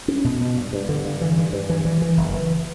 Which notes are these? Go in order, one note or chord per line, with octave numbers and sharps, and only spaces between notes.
C#4
B2
B2
G2
G2
D3
G2
E3
G2
G2
E3
E3
E3
F#1
E3